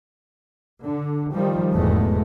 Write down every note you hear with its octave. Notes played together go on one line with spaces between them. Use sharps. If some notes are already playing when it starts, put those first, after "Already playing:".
D3
D#3 F3 G3
F1 E2 G#2 B2 G#3 A3